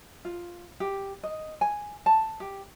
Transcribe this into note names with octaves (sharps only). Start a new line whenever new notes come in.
F4
G4
D#5
G#5
A5
G4